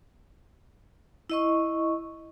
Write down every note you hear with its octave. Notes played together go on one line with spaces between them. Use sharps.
E4 D#5 C#6